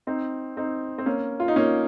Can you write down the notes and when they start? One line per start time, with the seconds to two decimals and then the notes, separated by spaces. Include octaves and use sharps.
0.07 C4 D#4
0.57 C4 D#4
0.98 C4
1.06 A#3 C#4
1.40 F4
1.48 D#4
1.56 A#3 C#4